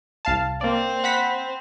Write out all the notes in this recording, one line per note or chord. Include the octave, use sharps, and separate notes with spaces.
C2 F5 A5
A#3 C4 D5
F#5 B5 B6